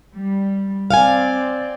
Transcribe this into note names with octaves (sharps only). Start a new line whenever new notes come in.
G3
C4 D5 F5 F#5 G#5